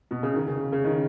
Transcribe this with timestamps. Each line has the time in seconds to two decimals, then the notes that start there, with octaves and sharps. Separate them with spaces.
0.11 B2
0.23 C#3
0.34 D#3
0.47 C#3
0.72 C#3
0.84 D#3